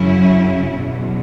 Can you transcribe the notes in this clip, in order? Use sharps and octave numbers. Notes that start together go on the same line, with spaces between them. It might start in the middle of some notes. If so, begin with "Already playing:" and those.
Already playing: F#2 C#3 F#3 C#4 E4
E2 B2 F#3